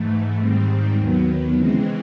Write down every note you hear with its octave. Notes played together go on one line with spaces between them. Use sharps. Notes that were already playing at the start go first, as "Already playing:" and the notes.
Already playing: G#2 E3 A3
G#2 D#3 G3 C4
D#2 D#3 F#3 B3
C#3 E3 G#3 C4